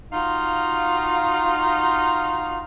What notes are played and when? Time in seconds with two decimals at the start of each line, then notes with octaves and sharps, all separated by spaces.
0.12 D#4 F4 F#4 F5